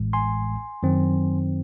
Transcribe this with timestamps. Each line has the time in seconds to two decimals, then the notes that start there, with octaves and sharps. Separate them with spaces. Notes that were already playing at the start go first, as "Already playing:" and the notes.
Already playing: A1 A2 E3 G#3
0.13 G#5 C6
0.83 F#2 D#3 F#3 C4